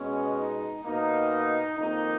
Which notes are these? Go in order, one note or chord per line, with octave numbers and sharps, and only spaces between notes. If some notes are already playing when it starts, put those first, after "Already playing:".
Already playing: B2 G#3 B3 C#4
D#4
B2 A#3 D#4
F2 D#3 A#3 D#4